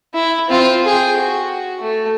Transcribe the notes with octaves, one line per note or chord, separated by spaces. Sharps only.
E4
C4 F4
G#4 G5
F#4
A3